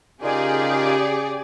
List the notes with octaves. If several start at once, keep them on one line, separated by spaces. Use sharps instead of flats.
C#3 D#4 F4 G4 G#4 A#4 D5 G#5